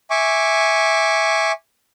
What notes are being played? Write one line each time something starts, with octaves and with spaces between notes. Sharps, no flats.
E5 G#5 C#6 D6